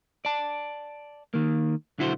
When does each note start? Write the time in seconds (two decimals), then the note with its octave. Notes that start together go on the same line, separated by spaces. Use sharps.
0.25 D5 A5
1.34 D#3 A#3
1.98 B1 D3 E4 F#4 B4 C5